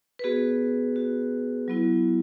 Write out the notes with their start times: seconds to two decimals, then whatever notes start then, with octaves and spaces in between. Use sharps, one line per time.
0.19 B4
0.24 B3 F#4 G#4
0.96 F#4
1.68 F#3 B3 E4